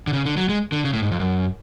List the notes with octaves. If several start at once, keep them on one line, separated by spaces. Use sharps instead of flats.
D3
C#3
D3
F#3
G#3
D3
C#3
A2
G#2
F2
F#2